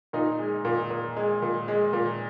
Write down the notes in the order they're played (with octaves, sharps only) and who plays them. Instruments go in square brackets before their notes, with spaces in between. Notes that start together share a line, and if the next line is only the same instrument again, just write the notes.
[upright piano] A#2 D#4
G#3
A#2
A#2
G#3
A#2
G#3
A#2